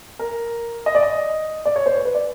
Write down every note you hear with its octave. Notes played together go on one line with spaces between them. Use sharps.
A#4
D#5
D5
D#5
D5
C#5
C5
B4
B4
D5